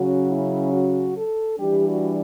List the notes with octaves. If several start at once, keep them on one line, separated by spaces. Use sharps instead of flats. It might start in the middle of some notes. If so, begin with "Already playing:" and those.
Already playing: C#3 F#3 C#4 F#4
E4
F#4
A4
E3 G3 D4 G4
F#4